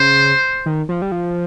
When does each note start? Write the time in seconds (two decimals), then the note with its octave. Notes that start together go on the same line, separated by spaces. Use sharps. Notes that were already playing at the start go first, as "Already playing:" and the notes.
Already playing: C#3 C5
0.66 D#3
0.89 F3
1.02 G3
1.12 F3